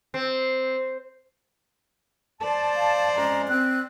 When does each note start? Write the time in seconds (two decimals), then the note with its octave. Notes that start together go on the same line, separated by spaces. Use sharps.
0.14 C4
2.41 C5 D5 A5
2.76 F5
3.16 F2 G#3 C#4 A#5
3.49 C4 F#6